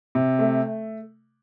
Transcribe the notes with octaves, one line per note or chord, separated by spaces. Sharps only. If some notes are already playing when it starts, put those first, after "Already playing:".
C3
A3